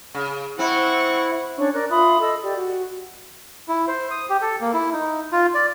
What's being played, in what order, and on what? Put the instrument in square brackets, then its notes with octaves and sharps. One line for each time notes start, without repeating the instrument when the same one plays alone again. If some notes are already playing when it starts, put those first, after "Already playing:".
[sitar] C#3
[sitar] C4 [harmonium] E4 [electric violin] F#5 C#6
[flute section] C#4 D4 C#5 C#6
A#4 D5 F#6
F4 E5 B5 D#6
A4 D#5 E6
G4 D5
F#4
[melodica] E4
C5
D#6
G4
A4
A#3
E4
D#4
F4
D5